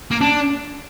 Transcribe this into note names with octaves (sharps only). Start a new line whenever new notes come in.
A#3
D4